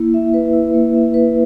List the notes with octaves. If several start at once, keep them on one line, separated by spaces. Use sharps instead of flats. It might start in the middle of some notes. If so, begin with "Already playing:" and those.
Already playing: A#3 E4
E5
B4
E4
A#3
E5
B4